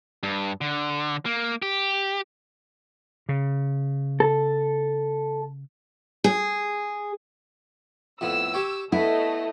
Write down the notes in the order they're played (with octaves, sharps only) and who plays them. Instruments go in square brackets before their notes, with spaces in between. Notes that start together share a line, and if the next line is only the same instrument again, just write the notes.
[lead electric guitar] G2
D3
A#3
G4
[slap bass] C#3
[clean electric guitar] A4
[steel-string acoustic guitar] G#4
[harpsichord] F2 A2 B3 [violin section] E6
[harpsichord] G4 C#5 G5
[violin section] A3 D#5 [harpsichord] B3 [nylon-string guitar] E4